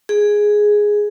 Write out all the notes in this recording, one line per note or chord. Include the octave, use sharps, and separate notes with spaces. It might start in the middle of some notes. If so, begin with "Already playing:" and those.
G#4